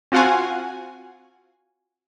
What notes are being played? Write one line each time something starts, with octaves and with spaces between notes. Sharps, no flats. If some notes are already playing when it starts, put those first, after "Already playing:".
C4 F4 F#4 F5 F#5 G#5